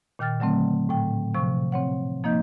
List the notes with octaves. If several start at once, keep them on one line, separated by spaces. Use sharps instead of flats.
A#2 D#3 G5 F6 A6
D3 F#3 A3 C4
A2 G5
C3 F3 C#6
C4 C#5 F#5
F3 A#3 D#4 D#5 G6